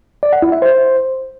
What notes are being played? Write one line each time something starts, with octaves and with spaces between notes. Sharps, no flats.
D5
F#5
E4
E5
C5